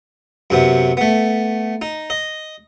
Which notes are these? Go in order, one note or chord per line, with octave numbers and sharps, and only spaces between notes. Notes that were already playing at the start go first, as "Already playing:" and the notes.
F#2 C3 B3
A3 B3
D#4
D#5